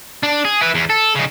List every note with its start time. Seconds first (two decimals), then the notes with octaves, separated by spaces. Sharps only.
0.23 D4
0.45 G#4
0.61 E4 B4
0.75 E2
0.90 A4
1.15 C#3 D#4